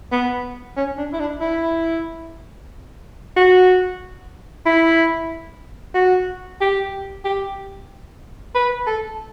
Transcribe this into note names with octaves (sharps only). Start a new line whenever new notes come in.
B3
C#4
D4
E4
D4
E4
F#4
E4
F#4
G4
G4
B4
A4